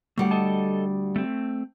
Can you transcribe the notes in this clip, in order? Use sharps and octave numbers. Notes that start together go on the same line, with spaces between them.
D2 G3 A3 F#5
A4 D#5 A5
A3 C4